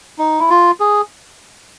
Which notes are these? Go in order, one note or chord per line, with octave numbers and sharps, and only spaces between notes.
D#4
E4
F4
G#4